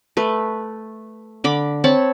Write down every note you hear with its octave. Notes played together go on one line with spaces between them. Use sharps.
A3 B4
D3 B5 D6
C4 C#5 A5 B5